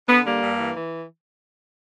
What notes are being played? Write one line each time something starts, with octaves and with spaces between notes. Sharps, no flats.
D3 B3
G3 A#3
G2
E3
E3